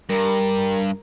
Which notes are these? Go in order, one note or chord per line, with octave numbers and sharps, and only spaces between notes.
G2 A#4 A#5